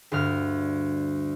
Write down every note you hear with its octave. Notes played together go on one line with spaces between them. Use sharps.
D2 G2 F6